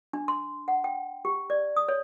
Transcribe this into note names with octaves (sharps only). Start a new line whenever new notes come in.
D4
C6
F#5
G5
G4
D5
D#6
C#5